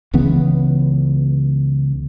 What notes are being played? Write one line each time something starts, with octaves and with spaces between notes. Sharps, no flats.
C#2 C#3 E3 B3